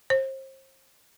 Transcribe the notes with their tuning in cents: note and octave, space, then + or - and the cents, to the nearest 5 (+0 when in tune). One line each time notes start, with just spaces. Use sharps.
C5 +35